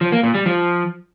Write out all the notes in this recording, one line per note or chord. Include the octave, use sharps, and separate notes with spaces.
F3
A#3
A#2
G3
F3